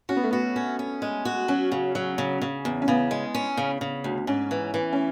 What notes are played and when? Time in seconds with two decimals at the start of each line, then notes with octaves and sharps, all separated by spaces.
0.09 C#4 F#4
0.16 B3
0.24 A3
0.31 B3 F#4
0.56 C#4
0.79 C#4
1.02 G#3
1.25 F#4
1.48 F#3 C#4
1.72 C#3
1.95 F#3
2.18 C#3
2.42 C#3
2.65 E2
2.82 C#4
2.88 C#3 B3
3.11 G#3
3.35 C#4
3.57 C#3
3.81 C#3
4.04 D2
4.27 G#2 C#4
4.51 E3
4.74 E3
4.93 C#4